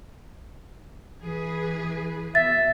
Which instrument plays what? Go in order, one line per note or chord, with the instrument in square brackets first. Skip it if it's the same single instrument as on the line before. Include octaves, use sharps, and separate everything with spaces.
[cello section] E3 G#4 B4
[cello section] B2 [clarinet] E5 [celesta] A6